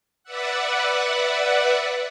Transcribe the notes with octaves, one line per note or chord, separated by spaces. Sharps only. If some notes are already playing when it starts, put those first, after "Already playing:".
B4 D5 E5 F#5